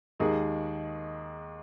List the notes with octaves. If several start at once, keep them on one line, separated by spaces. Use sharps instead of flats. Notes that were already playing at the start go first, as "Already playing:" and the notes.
D#2 D#3 G#3 D#4 G#4